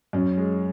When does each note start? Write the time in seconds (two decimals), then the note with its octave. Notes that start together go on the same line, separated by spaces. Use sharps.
0.13 F#2 C#4
0.37 G#3